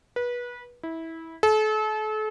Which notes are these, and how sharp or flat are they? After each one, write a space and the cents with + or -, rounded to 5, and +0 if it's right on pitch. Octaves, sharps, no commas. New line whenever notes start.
B4 -25
E4 -20
A4 -35